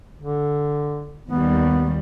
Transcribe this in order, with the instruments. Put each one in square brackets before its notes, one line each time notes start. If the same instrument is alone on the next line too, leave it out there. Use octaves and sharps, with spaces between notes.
[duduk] D3
[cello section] D#2 G3 [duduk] B3